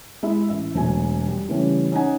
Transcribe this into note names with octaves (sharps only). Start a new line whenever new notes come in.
G#3 E4 E5
A1 E5
E1 F#3 A3 G#5
G3
C#3 E3 G3 A3 C#4
C#4 D#4 D#5 F#5 G#5